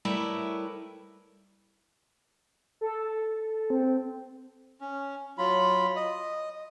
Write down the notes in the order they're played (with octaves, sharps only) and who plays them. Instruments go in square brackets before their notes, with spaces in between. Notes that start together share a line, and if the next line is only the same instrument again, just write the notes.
[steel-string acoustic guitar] G3 A3 E4 A#4 B4 C#5
[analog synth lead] A4
C4
[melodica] C#4
F#3 F4 B5
D#5